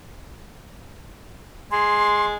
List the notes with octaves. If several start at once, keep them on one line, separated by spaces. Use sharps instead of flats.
G#3 C6